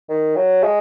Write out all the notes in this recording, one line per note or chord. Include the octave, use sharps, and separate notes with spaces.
D#3
F#3
G#3